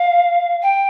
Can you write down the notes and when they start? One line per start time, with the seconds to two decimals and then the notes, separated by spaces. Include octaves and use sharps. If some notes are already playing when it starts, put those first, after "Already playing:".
Already playing: F5
0.63 G5